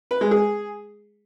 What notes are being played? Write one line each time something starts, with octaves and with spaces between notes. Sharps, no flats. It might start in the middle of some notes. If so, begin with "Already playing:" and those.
B4
G#3
G#4